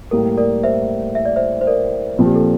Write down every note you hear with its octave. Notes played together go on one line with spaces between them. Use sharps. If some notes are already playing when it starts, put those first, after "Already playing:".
A2 G3 A#3 A#4
A#4 D5
C5 E5
E5
D5
C5 E5
C5
A#4 D5
A#2 F3 C4
G4
A4